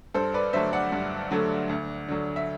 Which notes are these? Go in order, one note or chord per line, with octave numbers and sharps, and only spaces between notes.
G2 A4 C5
B4 D5
D3 F#3 A3 C5 E5
D5 F#5
G2
D3 F#3 A3
D2
D3 F#3
E5